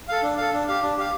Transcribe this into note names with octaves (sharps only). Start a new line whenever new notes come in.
A4 F5
D4
A4 F5
D4
G4 F5
D4
G4 F5